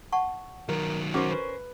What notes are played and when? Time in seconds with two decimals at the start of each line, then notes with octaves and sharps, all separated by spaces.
0.13 F#5 A5 C#6
0.69 D#3 F#3 A#4
1.14 C#4 F#4 A#4 C5 D6
1.31 B4